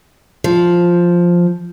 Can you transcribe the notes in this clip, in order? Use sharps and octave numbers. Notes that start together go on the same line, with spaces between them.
F3